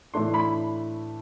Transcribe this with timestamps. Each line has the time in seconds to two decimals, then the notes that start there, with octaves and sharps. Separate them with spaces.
0.14 A2 E3 A3 D4 C6
0.34 B5